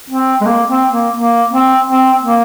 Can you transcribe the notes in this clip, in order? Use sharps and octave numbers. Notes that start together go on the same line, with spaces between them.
C4
G#3
A#3
C4
A#3
A#3
C4
C4
A#3